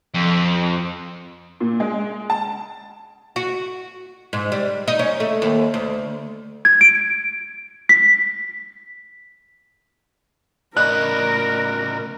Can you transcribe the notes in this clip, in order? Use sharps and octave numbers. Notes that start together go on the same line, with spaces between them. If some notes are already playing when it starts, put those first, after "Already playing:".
F2
A#2
G#3
A5
F#4
G#2
G3
D#4
C#4
A3
D#2
D2
G#6
D7
B6
A2 C#3 A#4 D5 D#5 B5 F#6